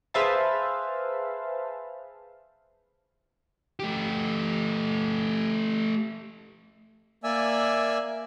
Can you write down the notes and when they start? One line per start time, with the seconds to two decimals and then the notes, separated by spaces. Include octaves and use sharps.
0.14 G#4 B4 C5 E5 F5 A5
3.79 A3 G4
7.24 A#3 D5 E5 G#5 E6